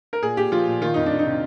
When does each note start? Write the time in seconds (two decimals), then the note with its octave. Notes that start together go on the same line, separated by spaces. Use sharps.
0.13 A#4
0.22 A#2 G#4
0.37 A#2 G4
0.52 F3 F4
0.67 A#2
0.81 D#3 F4
0.94 F2 D#4
1.06 F2 D4
1.19 D#4
1.26 C3